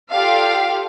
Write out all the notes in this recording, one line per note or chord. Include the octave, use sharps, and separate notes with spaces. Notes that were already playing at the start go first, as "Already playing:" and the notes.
F4 G4 A4 D5 F5